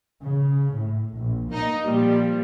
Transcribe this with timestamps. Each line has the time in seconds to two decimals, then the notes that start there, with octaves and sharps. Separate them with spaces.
0.22 C#3
0.74 A2
1.16 A#1
1.50 A#3 D#4
1.84 A#2 F3 G3